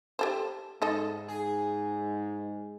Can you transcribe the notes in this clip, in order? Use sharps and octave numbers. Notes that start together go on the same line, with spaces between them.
G4 A4 C5
G#2 D#4 A4 D#5
G#4